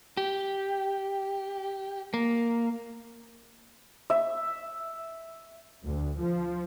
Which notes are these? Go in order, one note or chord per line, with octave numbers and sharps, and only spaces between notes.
G4
A#3
E5
D2
F3